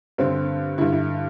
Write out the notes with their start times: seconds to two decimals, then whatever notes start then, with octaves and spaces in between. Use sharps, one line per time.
0.18 G2 D3 C4
0.78 G2 D3 E4
0.92 E4